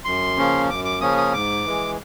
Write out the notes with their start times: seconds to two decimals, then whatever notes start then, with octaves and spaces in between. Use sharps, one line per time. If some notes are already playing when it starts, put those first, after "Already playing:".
0.05 F#2 C6
0.37 C#3 F3 A#3 C#4
0.69 F#2 D6
0.85 D6
1.01 C#3 F3 A#3 C#4 D#6
1.17 D#6
1.33 G#2 D6
1.65 E3 G#3